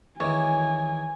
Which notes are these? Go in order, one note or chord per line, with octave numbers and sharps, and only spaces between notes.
E2 D#3 E3 C#5 G#5